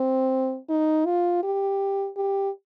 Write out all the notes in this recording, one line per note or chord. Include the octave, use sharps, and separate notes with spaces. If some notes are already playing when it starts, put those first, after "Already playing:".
Already playing: C4
D#4
F4
G4
G4